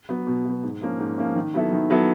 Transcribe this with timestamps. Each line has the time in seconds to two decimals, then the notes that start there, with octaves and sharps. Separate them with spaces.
0.09 F#3 B3
0.27 B2
0.45 F#3 B3
0.63 G#2
0.81 F3 A#3 C#4
0.99 G#2
1.18 F3 A#3 C#4
1.36 D#3
1.54 F#3 B3 E4 A4
1.72 D#3
1.90 F#3 B3 E4 A4